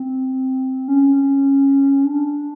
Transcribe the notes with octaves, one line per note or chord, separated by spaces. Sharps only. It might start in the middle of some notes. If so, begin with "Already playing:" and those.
Already playing: C4
C#4
D4